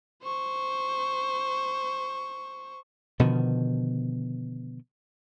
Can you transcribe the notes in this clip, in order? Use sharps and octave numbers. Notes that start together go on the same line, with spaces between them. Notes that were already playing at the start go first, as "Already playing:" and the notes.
C5 C#6
B2 D3 D#3 F3